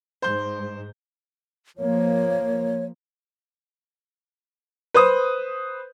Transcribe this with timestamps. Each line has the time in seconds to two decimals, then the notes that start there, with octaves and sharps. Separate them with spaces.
0.22 G#2 C5 G6
1.78 F3 A#3 C#5
4.94 B4 C5 D#6